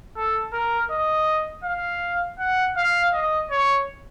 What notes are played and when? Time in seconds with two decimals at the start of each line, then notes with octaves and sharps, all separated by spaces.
0.16 A4
0.53 A#4
0.91 D#5
1.64 F5
2.39 F#5
2.77 F5
3.13 D#5
3.51 C#5